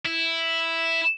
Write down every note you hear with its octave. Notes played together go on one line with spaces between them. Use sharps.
E4